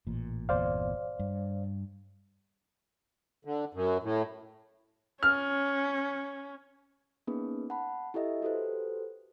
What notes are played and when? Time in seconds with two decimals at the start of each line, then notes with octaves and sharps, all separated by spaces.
0.07 A1 A#2
0.49 G1 E2 A#2 C5 D5 F5
1.19 G2
3.45 D3
3.74 F#2
4.03 A2
5.23 C#4 F6
7.27 A#3 B3 C#4 D#4 G#4 B4
7.70 F#5 A5 B5
8.14 E4 G4 A4 D#5 E5
8.42 F#4 G4 A4 B4 C5